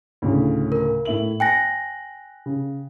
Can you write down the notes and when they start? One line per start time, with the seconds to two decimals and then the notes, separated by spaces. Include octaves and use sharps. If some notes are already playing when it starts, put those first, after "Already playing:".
0.22 D2 A2 C#3
0.72 A#4
1.05 A2 E5 F#7
1.40 G5 G#5 F#6 A#6
2.46 C#3